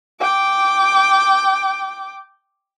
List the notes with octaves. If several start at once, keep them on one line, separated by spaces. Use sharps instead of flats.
G5 D6